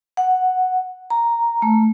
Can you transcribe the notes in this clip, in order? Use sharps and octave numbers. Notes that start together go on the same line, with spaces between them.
F#5
A#5
A3